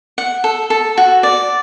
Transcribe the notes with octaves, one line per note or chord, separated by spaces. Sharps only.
F#5
A4
A4
F#4
D5